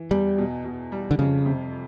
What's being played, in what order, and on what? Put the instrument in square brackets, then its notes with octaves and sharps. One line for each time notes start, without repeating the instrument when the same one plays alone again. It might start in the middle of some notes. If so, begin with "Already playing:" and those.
Already playing: [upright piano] E3
[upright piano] E2 [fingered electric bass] G3
[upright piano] B2
B2
G3
[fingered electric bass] D3
[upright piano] F2 [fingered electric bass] C#3
[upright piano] C3